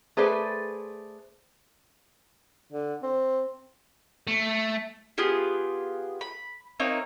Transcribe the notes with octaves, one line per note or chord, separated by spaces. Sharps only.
A3 G#4 A4 B4 C5 D5
D3
C4
A3
B3 F4 G4 G#4
B5
A#3 C4 D#4 C#5